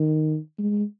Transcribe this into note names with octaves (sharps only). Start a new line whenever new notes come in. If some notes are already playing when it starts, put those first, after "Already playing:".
Already playing: D#3
G#3